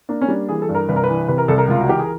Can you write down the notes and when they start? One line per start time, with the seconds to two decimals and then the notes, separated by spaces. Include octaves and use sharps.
0.09 A#3 D4
0.21 C#4
0.28 G3 D4
0.49 E3 G#4
0.62 A4
0.69 G2
0.75 A#4
0.89 C2 B4
0.96 A#4
1.04 E3 B4
1.28 C3 B4
1.38 A#4
1.48 C2 A4
1.58 A#4
1.68 C#2 F4
1.81 F#4
1.88 E3 G4
1.99 G#4